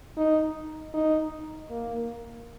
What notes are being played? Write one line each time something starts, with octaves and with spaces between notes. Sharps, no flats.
D#4
D#4
A#3